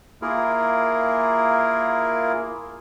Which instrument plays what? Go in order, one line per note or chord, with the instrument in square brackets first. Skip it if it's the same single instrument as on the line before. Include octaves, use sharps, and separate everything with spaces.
[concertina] A#3 E4 F4 G#4 A#4